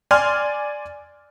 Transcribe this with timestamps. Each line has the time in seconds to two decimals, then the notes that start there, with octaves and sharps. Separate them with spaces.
0.11 D5 G#5 C6 F6